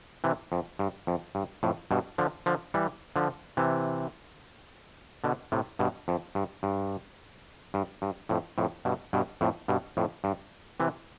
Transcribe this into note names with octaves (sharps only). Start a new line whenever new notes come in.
C3 E3
F2
G2
F2
G2
F2 A2
G2 B2
D3 F3
D3 F3
E3 G3
D3 F3
C3 E3
B2 D3
A2 C3
G2 B2
F2
G2
G2
G2
G2
F2 A2
F2 A2
G2 B2
G2 B2
F2 A2
G2 B2
F2 A2
G2
C3 E3